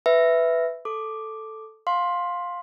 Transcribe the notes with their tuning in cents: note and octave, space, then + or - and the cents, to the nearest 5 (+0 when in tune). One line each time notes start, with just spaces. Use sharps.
B4 +10 E5 +0
A4 +0 D6 +0
F5 +15 C6 +10